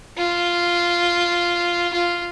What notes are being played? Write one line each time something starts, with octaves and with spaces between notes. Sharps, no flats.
F4
F4